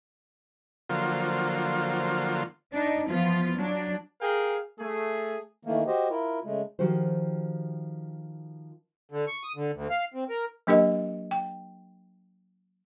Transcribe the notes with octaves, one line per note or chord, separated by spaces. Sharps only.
D3 F3 F#3 A#3 F4 C5
D4 D#4
E3 F3 B3 F4
F#3 D4
G#4 A#4 F5 G5
A3 G#4
D#3 E3 A3 A#3
F#4 G4 C5 D#5
E4 F4 A#4
C#3 G#3 A3
D#3 F3 F#4 G4 C5
D3
C#6
D#6
D3
D2
F5
C4
A#4
F#3 A#3 D4 G4 A#4 D#5
G5